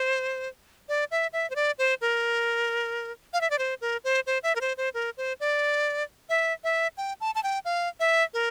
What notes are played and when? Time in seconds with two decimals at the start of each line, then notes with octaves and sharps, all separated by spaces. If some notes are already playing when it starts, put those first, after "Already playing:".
Already playing: C5
0.89 D5
1.11 E5
1.33 E5
1.50 C5
1.56 D5
1.78 C5
2.01 A#4
3.33 F5
3.41 E5
3.50 D5
3.59 C5
3.81 A#4
4.04 C5
4.27 C5
4.43 E5
4.56 A#4
4.61 C5
4.77 C5
4.94 A#4
5.17 C5
5.40 D5
6.29 E5
6.64 E5
6.97 G5
7.21 A5
7.35 A5
7.43 G5
7.65 F5
8.00 E5
8.34 A#4